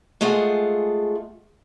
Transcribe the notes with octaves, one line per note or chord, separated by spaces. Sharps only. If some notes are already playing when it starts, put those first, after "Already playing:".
G#3 A3 F4 G#4 F#5